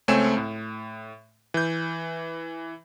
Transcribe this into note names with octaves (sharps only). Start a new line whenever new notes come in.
C#2 A3 C4 C#5 G#5 E7
A2
E3 G6